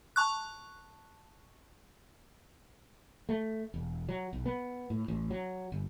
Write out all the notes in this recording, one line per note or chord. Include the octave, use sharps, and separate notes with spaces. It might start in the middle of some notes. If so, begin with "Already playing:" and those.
A5 C#6 F#6
A3
E1
F#3
B1
B3
A2
A1
F#3
G1